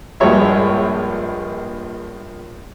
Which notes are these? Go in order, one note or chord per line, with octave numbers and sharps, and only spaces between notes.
A#1 G2 G#3 C#5 E5